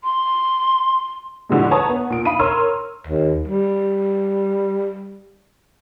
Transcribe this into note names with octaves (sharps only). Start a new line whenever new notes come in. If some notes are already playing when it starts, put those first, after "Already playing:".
C6
A2 D3 F3 G3 G#3
B4 C#5 A5 A#5 D#6
B3
A#2 D7
F5 B5 D#6 D#7
A#4 C#5 C6 E6 F6
D#2
G3